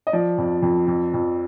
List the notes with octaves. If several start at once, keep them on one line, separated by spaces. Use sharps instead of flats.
D#5
F3 D5
F2
F2
F2
F2